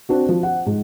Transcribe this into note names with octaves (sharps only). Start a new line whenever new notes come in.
C4 D4 F#4
F3
F#5
G#2